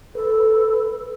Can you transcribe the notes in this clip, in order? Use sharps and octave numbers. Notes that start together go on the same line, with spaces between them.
A4 B4